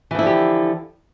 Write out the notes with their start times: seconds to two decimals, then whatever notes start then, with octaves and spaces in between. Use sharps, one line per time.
0.11 E3
0.15 F3
0.19 E4
0.23 D3
0.26 G4